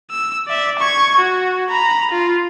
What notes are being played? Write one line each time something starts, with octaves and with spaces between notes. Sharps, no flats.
E6
D5 E5
C#6 G#6
F#4
A#5 B5
F4